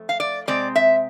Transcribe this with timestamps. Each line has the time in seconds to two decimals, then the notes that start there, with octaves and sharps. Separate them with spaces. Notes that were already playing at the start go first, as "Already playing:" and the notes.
Already playing: F2 A3
0.09 F5
0.20 D5
0.47 C3 G#3 C4 D5
0.76 E5